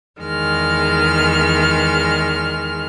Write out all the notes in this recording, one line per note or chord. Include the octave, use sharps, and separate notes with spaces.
E2 D#3 G#3 F6